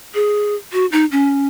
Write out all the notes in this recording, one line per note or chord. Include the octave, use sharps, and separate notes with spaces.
G#4
F#4
D#4
C#4